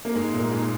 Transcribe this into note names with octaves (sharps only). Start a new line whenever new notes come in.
A#3
G#2 G#3
A#2 A#3
G#2 G#3